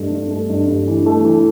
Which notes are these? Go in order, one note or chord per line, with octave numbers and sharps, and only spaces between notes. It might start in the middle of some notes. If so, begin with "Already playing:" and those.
Already playing: G2 A3
G2
A3
G2
G2
E3
A3
E3